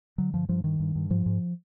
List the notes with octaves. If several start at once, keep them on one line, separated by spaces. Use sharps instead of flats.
D3 F#3
G2 F3
G2 F3
G2 D#3
G2
G2
G#2 F3
G#2